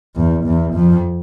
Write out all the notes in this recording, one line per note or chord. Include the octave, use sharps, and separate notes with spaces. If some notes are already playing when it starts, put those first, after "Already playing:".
E2
E2
F2